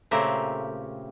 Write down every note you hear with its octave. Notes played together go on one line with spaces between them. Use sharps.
A#2 C#3 A3 C4 G4 A#4